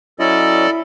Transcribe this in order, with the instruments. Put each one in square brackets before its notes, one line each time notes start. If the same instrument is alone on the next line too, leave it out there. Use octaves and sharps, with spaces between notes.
[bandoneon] F#3 C#4 D#5 [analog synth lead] E4 [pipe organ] A4 D5